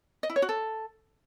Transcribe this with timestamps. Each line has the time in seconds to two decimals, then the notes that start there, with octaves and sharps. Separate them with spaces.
0.23 D#5
0.30 E4
0.36 C#5
0.42 F#4
0.49 A4